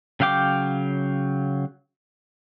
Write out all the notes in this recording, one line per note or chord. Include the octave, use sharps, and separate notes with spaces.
C#3 F#3 F5 G5 D6